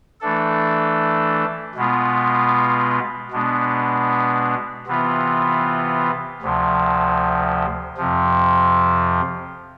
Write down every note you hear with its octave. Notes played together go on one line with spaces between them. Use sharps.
E3 A3 D4 A4
B2 G#3 B3 F4
B2 G#3 B3 D4
C3 E3 B3 F4
D2 C3 F3
F2 C3 F3